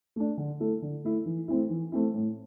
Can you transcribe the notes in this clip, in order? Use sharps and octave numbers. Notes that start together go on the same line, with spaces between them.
A3 D4
D3
A3 E4 A4
D3
A3 E4 A4
E3
A3 C4 E4
E3
A3 C4 E4
A2